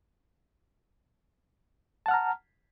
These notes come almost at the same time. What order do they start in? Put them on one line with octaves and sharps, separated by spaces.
A5 F#5 F6 A#5